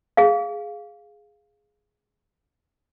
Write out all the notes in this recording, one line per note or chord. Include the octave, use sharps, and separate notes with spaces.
G#4 F5